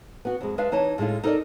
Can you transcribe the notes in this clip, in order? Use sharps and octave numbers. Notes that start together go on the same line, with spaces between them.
B3 F#4
F2 G#3
G#3 D4 B4 E5 F5
E3 D#4 C#5 A5
A2 G#3 A3 D#4 F4
D#4 A4 A#4 C5 D5 D#5